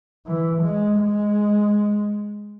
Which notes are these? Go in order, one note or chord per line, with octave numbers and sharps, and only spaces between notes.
E3
G#3
G#3